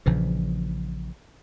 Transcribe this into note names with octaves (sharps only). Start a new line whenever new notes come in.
A#1 C#3 E3 F3